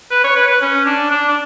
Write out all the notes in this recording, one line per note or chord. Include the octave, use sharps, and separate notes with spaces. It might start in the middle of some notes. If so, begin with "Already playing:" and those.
B4
C#5
B4
B4
C#4
D4
D4
D4